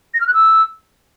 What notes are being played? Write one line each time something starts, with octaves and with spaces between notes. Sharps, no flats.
A#6
F6
F#6
E6